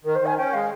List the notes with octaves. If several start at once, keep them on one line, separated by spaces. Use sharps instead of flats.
D#3 A#4
D#3 C5
G#5
C#4 G5
G#3 F5